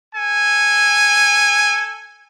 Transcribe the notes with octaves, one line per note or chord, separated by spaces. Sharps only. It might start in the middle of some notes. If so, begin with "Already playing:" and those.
A4 G#5